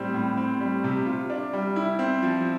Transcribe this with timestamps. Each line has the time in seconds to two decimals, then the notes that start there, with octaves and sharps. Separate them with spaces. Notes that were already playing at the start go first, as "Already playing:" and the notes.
Already playing: A2 G3 C4
0.14 A2
0.37 C4
0.60 G3
0.84 C3
1.06 F4
1.30 D4
1.53 G3
1.76 E4
1.99 C4
2.23 F3